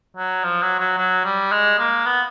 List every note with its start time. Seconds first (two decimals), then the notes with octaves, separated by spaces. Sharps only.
0.17 F#3
0.44 F3
0.62 F#3
0.80 F#3
0.98 F#3
1.25 G3
1.52 G#3
1.79 A#3
2.05 B3